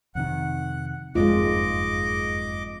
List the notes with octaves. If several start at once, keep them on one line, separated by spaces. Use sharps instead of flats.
F2 C3 D#3 F#5
F#1 F2 G#2 G#3 A#3 F4 D#5 D6